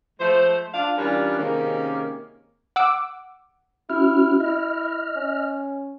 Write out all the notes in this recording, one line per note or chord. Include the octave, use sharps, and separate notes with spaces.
F3 G#3 A3 C5
D4 F4 F5
E3 G3 C#4 D4 F4 A#4
C3 D#3 G#3 A#3 C#4
F#5 D6 E6 D7
C#4 E4 F#4 F6
E4 D#5 F6
C#4